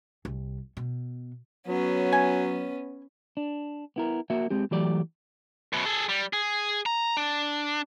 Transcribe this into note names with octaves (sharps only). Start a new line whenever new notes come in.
C2
B2
F#3 B3 C#4
G#5
D4
B3 E4 A#4
A#3 F#4 A#4 E5
G#3 C4 G4
E3 F#3 A3 G4 D5
F#2 B2
G#4 A4
G3
G#4
A#5
D4